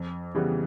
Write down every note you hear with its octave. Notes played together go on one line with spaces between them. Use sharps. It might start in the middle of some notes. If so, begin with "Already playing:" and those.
Already playing: F2
C#3 E3 G3 B3